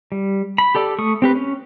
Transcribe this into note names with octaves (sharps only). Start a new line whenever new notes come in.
G3
B5
G4 A4 D5
A3 C#6 D#6
C4 G4 B4
C#4